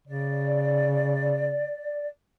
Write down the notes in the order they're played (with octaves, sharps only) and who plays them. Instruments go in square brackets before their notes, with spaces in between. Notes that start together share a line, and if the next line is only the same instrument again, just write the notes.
[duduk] C#3 [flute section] D5